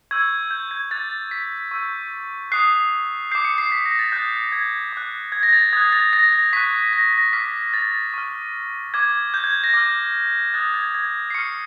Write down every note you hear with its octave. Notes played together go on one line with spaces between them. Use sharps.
C#6 E6 G6 G#6
G6
G#6
D6 F#6 A6
B6
C#6 E6 G6
D#6 F#6 C7
D6 G6 C7
C#7
C7
B6
A#6
A6
D#6 F#6 G6
G#6
D6 F#6
G#6
A#6
A6
D#6 F#6 G#6
A6
A#6
A#6
C#6 F#6 B6
A#6
A#6
D6 F6 B6
A6
C#6 F6
D6 F6 G#6
G6
G#6
A#6
D6 F6
D#6 F#6 A6
G#6
G#6
C7
C#6 F6 C#7